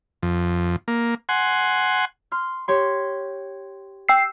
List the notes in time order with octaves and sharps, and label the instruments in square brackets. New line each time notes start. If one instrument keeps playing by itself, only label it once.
[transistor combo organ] F2
A#3
F#5 G#5 C6
[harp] C6 F6
G4 C#5 C6
[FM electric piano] G5 E6 C7